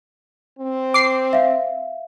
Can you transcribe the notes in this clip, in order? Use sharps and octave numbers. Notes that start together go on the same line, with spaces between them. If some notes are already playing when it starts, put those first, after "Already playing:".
C4
D6 C7
E5 F5